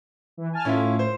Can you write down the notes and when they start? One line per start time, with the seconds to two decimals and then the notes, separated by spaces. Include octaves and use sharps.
0.37 E3
0.53 G#5 A5 F6
0.65 A2 C#4 E4 F4
0.99 C5